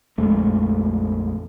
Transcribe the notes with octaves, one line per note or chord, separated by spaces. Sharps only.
A#1 F2 G#3 A3